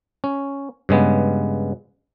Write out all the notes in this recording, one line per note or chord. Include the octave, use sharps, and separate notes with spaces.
C#4
G2 C#3 G#3 B3